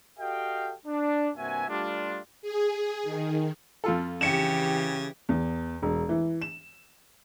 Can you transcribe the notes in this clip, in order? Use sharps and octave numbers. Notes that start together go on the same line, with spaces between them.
F#4 G4 A4 D#5 F5 G5
D4
G2 C3 A#3 F#4 E5 G#5
G3 A3 D4 F4
G#4
D#3
F2 F4 A4
C#3 E3 G4 C#7 E7
E2
E1
E3
E7